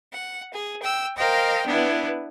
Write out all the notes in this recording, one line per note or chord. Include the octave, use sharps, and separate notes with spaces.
F#5
G#4
G5 E6
A#4 C5 D#5 F5 G5
B3 D4 E4 B4